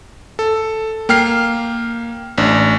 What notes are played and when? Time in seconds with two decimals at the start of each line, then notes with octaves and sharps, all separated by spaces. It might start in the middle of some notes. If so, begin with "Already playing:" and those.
0.39 A4
1.09 A#3 G5 F6 C7
2.38 A1 D4